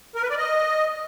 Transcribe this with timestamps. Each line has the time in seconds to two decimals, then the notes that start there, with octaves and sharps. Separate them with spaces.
0.15 A#4
0.23 B4
0.30 D5
0.38 D#5